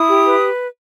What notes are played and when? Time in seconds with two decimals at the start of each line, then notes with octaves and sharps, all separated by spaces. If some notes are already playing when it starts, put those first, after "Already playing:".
Already playing: E4 D#6
0.09 G4
0.26 B4